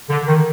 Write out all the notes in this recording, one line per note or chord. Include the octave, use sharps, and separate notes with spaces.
D3
D#3